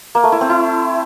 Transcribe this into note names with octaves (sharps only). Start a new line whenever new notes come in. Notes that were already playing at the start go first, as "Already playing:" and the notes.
A#3
A3
E4
C4
E4